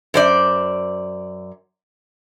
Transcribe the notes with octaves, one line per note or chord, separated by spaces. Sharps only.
F#2 C5 D5